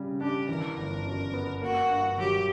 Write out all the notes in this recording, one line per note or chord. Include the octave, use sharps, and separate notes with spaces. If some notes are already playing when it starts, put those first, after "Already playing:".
Already playing: C#3 G3
D4 G4
E3 A#4
G1
F#2
B3
A#3 F#4
G2
F#3 G4